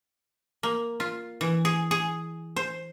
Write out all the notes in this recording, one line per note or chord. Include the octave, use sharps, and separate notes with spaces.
A#3
F4
E3
G#4
G#4
C5